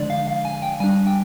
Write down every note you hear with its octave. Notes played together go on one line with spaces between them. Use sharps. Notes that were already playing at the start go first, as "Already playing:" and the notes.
Already playing: D3 F3 G#3 D4 D5
F5
F5
G#5
G5
G3 D4 G#5
G5